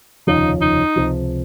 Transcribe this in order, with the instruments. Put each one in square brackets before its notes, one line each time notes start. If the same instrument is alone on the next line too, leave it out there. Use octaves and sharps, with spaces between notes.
[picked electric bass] F1 D#2 C#3 F3 [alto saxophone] D#4
[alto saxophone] D#4
[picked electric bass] C#2 C3 F3